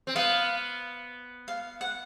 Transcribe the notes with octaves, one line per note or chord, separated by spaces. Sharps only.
C4
B3 F5
F5
F#5